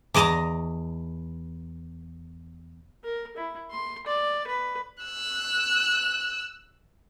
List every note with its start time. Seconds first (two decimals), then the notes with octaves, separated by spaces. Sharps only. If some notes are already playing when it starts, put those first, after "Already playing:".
0.14 E2 D5 D#5 A5 A#5
3.04 A#4
3.37 E4
3.71 C6
4.07 D5
4.47 B4
5.04 E6 F#6